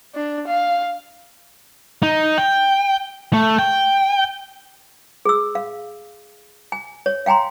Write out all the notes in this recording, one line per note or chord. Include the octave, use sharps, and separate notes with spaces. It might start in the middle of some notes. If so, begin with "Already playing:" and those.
D4
F5
D#4
G5
A3
G5
G#4 E6
F5
G#5
C#5
F5 G5 G#5 A#5 C6